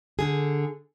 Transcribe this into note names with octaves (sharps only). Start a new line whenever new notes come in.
D3 G#4